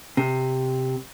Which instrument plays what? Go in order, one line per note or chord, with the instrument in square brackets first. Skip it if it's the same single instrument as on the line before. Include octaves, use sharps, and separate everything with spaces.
[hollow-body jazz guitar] C3